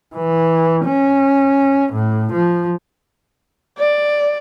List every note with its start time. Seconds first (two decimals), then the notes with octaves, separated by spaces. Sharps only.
0.15 E3
0.86 C#4
1.93 A2
2.33 F3
3.79 D5